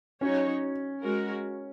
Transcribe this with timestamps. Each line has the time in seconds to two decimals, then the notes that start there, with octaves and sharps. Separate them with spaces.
0.21 F#3 C#4 D#4 F#4 C#5
1.02 G#3 F#4 A#4